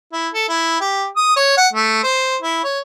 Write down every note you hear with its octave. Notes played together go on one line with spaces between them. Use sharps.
E4
A4
E4
G4
D#6
C#5
F#5
A3
C5
E4
C#5